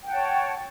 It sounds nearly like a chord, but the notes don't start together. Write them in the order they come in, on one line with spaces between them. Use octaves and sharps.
G5 F#5 A5 C#5